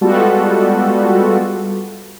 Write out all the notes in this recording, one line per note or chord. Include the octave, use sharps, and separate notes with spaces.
G3 G#3 B3 F4 F#4 A4